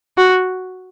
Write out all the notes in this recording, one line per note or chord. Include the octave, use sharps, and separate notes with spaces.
F#4